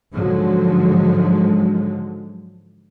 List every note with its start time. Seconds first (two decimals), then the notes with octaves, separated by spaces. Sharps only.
0.13 G#2 D3 F3 F#3 G#3